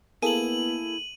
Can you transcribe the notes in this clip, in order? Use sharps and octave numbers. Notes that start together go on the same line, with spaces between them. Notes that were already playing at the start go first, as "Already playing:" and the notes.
A#3 B3 E4 G#4 A4 D#7 F#7